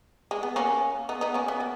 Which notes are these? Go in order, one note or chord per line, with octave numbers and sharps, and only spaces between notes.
G#3
B3
A#3 C#4
B3 D#4
B3 D#4
A#3 C#4
B3
A#3